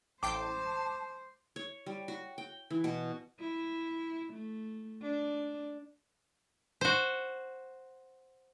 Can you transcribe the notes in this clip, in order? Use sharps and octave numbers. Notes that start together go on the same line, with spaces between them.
A1 C5 G5 A5 D6 C7
C#5
G3
F#4
G5
E3
B2
E4
A3
D4
F#4 C5